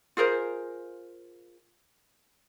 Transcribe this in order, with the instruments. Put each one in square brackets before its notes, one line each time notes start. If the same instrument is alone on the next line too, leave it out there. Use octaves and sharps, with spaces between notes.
[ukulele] F4 G#4 A#4 C5